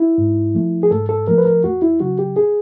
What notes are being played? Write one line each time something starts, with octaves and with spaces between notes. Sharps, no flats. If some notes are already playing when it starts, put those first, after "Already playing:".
Already playing: E4
G#2
F3 A3
G#4
G#2 A4
A4
F3 A3 A#4
B4
A#4
E2 F#4
E4
C#3 F#3 F#4
G4
G#4